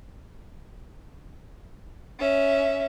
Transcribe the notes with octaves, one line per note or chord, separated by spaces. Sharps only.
C#4 E5